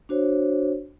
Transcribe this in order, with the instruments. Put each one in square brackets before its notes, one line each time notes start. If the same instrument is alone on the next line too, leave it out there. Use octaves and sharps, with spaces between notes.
[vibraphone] D4 F#4 C5 C#5